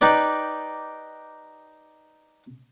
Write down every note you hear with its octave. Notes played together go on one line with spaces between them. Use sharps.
D#4 G4 B4 D5